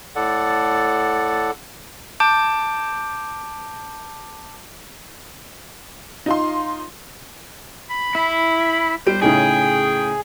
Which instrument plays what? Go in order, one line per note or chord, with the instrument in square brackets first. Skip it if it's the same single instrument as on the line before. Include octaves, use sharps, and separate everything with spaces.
[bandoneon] A2 A4 D5 F#5
[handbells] A5 D6 G6 D7
[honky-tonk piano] D#4 F4 C6
[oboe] B5
[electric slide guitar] E4
[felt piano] G3 G4 D7 [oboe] C5
[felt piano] A2 C#3 D#4 [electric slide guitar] G#4 [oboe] G5